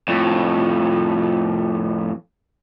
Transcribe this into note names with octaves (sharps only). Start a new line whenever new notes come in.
F2 A2